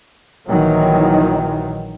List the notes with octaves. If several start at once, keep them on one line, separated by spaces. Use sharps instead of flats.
A#1 D#3 E3 F#3